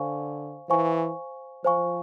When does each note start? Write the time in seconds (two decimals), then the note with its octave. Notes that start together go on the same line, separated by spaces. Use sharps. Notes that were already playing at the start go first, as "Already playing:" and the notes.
Already playing: D3 C5 F5 G#5 C#6
0.69 E3 C5 F5 G#5 C#6
1.64 F3 C5 F5 G#5 C#6